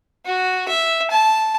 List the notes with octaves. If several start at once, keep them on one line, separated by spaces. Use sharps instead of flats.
F#4
E5
A5